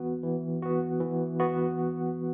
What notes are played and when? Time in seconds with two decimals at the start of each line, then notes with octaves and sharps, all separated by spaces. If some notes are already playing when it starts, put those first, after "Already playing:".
Already playing: E3 B3 F#4
0.23 E3
0.62 B3 F#4
1.00 E3
1.40 B3 F#4